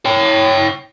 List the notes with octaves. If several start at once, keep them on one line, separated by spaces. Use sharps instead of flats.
C#5 G5